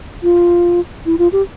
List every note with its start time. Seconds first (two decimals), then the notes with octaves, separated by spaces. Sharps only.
0.23 F4
1.06 E4
1.19 F4
1.32 G4